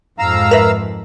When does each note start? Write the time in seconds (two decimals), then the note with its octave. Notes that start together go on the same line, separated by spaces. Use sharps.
0.19 F2 G#2 F5 A#5 E6
0.51 A#4 B4 E5